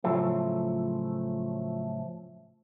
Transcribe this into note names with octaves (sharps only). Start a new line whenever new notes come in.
A2 C#3 F3 F#3 A3